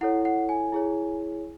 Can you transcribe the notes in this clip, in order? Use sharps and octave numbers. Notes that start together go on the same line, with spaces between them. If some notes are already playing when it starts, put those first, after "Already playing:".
E4 A4 C#5 F#5
F#5
G#5
E4 G#4 C#5